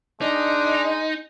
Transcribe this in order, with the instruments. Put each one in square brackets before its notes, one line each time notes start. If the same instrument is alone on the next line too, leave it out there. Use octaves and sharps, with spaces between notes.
[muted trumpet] G#3 [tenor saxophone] D4 [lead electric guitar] D#4